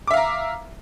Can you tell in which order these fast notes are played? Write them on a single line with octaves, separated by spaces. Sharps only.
D6 E5 F5 A#5